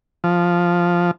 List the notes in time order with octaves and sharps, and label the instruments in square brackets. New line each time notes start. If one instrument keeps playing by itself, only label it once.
[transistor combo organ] F3